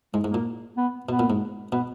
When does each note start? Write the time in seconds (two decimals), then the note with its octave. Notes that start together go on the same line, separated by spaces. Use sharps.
0.13 G#2 G#3
0.24 G#2
0.30 A#2 A#3
0.77 B3
1.09 B2 B3
1.19 A#2
1.30 G#2
1.72 B2 B3